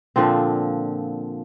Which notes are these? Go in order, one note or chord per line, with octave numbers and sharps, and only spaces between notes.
A#2 D3 F3 C4